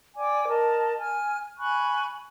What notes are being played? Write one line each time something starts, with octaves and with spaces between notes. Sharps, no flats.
D5 G5 G#5 D6
A#4 D#5 A5
G#5 F6
G#5 B5 C#6 F#6